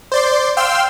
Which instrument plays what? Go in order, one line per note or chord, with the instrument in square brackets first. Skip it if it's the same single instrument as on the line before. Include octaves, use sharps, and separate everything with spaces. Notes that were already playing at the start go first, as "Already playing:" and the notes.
[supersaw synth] C5 D5 C6
F5 G5 C6 E6